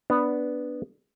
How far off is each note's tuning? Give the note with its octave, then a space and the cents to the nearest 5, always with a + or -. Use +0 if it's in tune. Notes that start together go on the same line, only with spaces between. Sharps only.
B3 +0 D4 +0